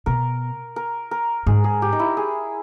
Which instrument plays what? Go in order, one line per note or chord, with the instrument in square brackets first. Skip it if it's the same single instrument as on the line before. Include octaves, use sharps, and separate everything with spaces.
[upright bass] B2 [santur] A#4
[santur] A#4
A#4
[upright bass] G#2 [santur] G#4
[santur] G#4
G4
D#4
E4
G#4